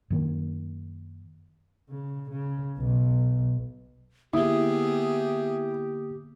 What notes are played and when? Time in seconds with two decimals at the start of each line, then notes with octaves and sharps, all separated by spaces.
0.10 F#2 D#3 A#3
1.90 C#3
2.30 C#3
2.78 B1
4.33 D3 A#3 B3 E4 G4 G#4 D#6